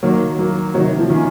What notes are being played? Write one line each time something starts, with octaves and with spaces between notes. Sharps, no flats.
D#3 F#3 A#3
F#3 A#3
C3 D#3 F#3
F3
D#3 A#3 C#4